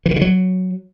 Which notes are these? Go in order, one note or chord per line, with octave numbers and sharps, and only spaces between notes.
E3
D#3
C#3
F#3